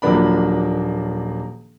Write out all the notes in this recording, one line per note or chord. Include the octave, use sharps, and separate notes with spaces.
D#1 F3 F#3 A#3 D4 B5